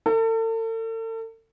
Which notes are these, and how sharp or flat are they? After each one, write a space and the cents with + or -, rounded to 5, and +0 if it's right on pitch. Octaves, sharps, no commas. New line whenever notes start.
A4 +40